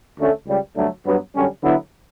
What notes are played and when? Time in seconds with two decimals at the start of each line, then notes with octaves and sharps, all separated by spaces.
0.17 D2 D3 A3 C#4
0.47 C#2 C#3 G3
0.76 G2 D3 F#3 A3
1.05 G2 F#3 B3
1.34 F#2 D3 G3 C#4
1.63 D3 F#3 B3 E4